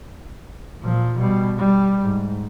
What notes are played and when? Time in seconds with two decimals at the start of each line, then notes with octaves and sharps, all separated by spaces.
0.80 A#2 F3
1.16 B2 G3
1.58 G3
2.03 G#2